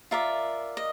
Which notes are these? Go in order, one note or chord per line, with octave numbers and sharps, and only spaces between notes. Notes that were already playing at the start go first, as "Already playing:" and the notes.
F4 A#4 D5 E5
D#5